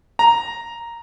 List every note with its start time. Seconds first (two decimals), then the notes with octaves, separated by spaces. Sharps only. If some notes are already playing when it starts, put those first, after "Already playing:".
0.19 A#5